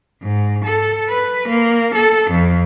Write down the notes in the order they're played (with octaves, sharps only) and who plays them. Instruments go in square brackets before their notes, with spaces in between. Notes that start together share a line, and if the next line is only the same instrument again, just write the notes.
[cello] G#2
A4
B4
A#3
A4
F2